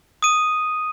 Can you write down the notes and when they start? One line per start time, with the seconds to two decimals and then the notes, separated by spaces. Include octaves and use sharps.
0.22 D#6 D#7